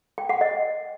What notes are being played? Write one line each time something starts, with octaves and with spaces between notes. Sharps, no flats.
G5
F#5
D#5